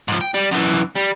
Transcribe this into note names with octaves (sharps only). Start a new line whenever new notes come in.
G#2 F3
G5
G3
F#2 E3
G3